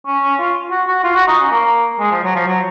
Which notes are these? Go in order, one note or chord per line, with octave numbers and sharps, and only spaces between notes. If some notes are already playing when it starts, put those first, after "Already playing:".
C#4
C#4
F4
F#4
F#4
F4
F#4
D#4
C#4
A#3
G#3
F3
F#3
F3
F#3